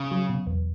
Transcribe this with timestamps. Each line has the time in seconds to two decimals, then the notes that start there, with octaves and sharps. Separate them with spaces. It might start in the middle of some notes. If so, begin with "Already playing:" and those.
Already playing: C#3
0.11 F#3
0.30 B2
0.47 E2